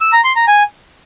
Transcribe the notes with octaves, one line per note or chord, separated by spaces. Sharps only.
E6
A#5
C6
A#5
G#5